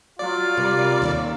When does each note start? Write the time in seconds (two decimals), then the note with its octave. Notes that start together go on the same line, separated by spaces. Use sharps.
0.19 F#3 F4 D5
0.57 C3 G3 A#4
1.02 D#2 C#3 A4